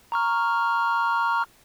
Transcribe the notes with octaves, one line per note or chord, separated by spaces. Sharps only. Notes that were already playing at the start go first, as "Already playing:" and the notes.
A#5 C#6 F6